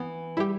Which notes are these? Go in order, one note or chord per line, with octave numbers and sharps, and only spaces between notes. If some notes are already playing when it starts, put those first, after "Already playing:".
Already playing: E3 B3
G3 E4 G4